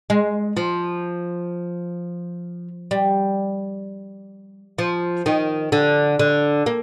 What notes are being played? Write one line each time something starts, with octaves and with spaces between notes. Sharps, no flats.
G#3
F3
G3
F3
D#3
D3
D3
A#3